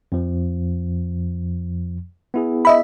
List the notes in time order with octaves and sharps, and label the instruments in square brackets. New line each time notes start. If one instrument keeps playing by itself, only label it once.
[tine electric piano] F2 F3
B3 E4 G#4
[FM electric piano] D#5 E5 B5